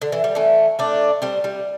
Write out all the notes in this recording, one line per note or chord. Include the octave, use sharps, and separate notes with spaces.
D3
E3
G3
E3 A3
A3 D4
G3 C4
G3